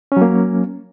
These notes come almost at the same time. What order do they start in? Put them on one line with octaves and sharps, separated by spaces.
C#4 F#3 A#3